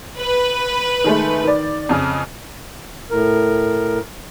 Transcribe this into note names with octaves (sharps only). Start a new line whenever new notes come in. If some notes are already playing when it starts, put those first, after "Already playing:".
B4
D#3 G#3 A3
D#3 D5
F2 C#3 F6
A2 A#4